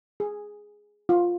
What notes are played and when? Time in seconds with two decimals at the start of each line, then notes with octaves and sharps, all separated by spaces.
0.20 G#4
1.09 F4